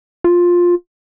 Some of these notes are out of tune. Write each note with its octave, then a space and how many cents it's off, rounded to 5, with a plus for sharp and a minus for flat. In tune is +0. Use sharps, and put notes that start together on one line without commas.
F4 +10